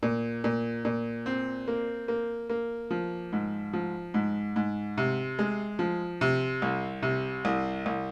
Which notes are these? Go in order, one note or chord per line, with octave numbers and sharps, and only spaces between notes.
A#2
A#2
A#2
C4
A#3
A#3
A#3
F3
G#2
F3
G#2
G#2
C3
G#3
F3
C3
C2
C3
C2
C2